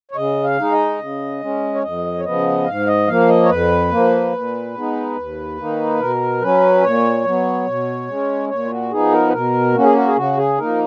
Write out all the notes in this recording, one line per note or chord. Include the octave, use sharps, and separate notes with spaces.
C#5
C#3 D#5
F5
G#3 D#4
D#5
C#3
G#3 C#4
C#5
F2 D#5
C#5
C#3 F3 B3 D#5
G#2 F5
D#5
F3 A#3 F5
D#5
C#5
F2 B4
F3 A#3
A#2
G#3 B3 D#4
D#2
D#3 A#3 D#4
B2 A#4
F#3 C#4 B4
A#2 C#5
F#3 B3
B2
G#3 C#4
A#2 C#5
F4
F#4
F3 B3 D#4 G#4
A#4
B4
B2 A#4
A#3 C#4 F#4
G#4
F#4
G#4
C#3 F#4
G#4
F3 A#3 D#4 A#4